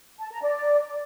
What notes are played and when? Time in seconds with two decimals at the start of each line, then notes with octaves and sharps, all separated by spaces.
0.20 A5
0.31 A#5
0.42 D5